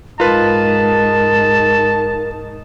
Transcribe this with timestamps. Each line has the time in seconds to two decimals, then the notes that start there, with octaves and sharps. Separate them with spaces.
0.20 G#2 D#4 F4 A#4 B4 A5